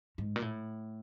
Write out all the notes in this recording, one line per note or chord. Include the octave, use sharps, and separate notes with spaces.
G#2
A#2
A2